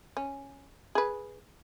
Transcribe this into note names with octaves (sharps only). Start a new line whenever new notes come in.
C#4
G#4 B4